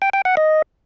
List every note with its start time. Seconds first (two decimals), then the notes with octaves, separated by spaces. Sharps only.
0.02 G5
0.13 G5
0.25 F#5
0.37 D#5